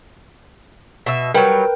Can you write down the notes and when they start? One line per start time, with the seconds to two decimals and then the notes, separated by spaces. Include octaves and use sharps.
1.06 B2 E5
1.34 F#3 G3 A#4 B4 G5